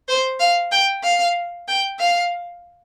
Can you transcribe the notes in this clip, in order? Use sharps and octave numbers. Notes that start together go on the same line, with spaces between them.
C5
F5
G5
F5
G5
F5